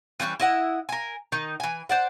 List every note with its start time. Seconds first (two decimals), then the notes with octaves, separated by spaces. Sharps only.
0.20 E3 G3 C#4 B4
0.40 E4 D#5 F#5
0.89 A#4 G#5
1.32 D#3 D#4
1.60 E3 G#5
1.89 C5 D5 F#5